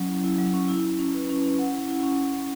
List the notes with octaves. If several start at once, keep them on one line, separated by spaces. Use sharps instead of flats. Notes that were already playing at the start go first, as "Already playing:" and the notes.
Already playing: F#3 C#4
E4
E4
F#3
C#4
E4
E4
C#4
B4
C#4
C#4
F#5
E4
E4
C#4
E4
F#5